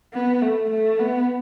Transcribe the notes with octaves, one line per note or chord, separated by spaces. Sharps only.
B3
A3
A3
B3